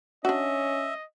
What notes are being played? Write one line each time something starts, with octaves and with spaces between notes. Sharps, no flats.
C#4 D4 F#4 D#5 E5